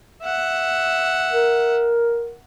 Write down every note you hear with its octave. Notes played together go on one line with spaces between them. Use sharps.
E5 F#5
A#4